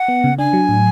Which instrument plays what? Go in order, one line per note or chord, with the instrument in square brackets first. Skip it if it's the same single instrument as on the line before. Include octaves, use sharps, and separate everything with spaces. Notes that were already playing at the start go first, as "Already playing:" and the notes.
Already playing: [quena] F#5
[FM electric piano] B3
C#3
[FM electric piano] D4 [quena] G#5
[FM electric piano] F#3
A2